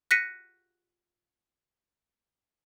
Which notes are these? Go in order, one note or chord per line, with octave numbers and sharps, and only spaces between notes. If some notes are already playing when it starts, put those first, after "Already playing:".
F#6 A#6 B6 C#7 D#7